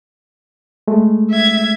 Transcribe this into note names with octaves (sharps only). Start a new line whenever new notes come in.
G#3 A3
E5 G#6